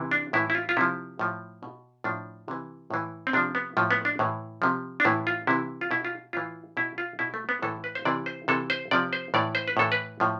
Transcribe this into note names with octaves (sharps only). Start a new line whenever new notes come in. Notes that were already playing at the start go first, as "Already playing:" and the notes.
Already playing: C3 E3
D4
A2 E3 E4
E4
F4
F4
C3 F3 E4
A2 F3
B2
A2 F3 D4
C3 E3
A2 E3
C4
C3 F3 D4
B3
A2 F3
B3
D4
A2 E3
C3 F3
D4
A2 E3 E4
F4
C3 E3 E4
F4
B2 E4
F4
A2 E3 F4
B2 E4
F4
B2 E4
A3
B3
A2 E3 A4
B4
C5
C3 E3 D5
C5
C3 E3 A4
C5
C3 F3 D5
C5
A2 E3 D5
C5
B4
A2 E3 A4
B4
A2 F3